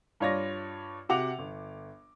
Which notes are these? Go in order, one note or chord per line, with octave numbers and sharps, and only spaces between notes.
G2 F4 C#5 D5 A#6
C3 F#4 F#5 D6 F7
G1